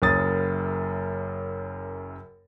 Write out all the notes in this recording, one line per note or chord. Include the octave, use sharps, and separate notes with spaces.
F#1 F#2 D#6 A6